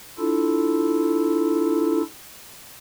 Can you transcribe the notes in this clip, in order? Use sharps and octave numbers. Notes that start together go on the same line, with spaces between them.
D4 E4 F4 A4